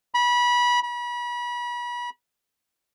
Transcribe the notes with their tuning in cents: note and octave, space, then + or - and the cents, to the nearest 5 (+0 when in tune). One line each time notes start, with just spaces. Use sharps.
B5 -25
B5 -35